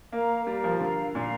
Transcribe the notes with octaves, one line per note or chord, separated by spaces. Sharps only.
A#3 A#4 F5 A#5
G3 A#4 F5 A#5
F3
D3 A#4 F5 A#5
A#2 A#4 F5 A#5